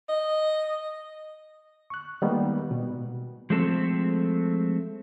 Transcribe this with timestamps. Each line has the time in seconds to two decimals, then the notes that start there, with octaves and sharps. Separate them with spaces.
0.09 D#5
1.90 C#6 F#6
2.22 D#3 G3 G#3 A#3 B3 D#4
2.71 B2
3.50 F3 G#3 A3 C4 A4